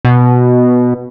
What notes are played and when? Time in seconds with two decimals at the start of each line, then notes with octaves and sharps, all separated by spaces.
0.05 B2